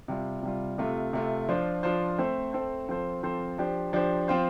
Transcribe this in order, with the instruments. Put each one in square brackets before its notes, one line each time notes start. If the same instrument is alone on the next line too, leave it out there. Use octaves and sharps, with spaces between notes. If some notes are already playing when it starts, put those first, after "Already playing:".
[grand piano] C3 G3 F4
C3 G3 F4
C3 A3 F4
C3 A3 F4
F3 D4 F4 C5
F3 D4 F4 C5
A3 C4 A4 C5
A3 C4 A4 C5
F3 C4 F4 A4 C5
F3 C4 F4 A4 C5
F3 D4 G4 C5
F3 D4 G4 C5
F3 C4 F4 C5